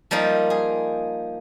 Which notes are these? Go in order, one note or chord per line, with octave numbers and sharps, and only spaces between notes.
F3 G3 A#3 D#4 F4
G#4